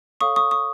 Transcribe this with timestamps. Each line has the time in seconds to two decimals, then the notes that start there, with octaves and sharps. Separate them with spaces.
0.21 A4 C#5 F5 C#6 D#6
0.36 C#6 D#6
0.51 C#6 D#6